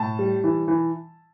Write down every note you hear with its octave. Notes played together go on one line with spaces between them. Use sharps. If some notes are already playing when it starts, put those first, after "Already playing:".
Already playing: A2 A5
G3
E3
E3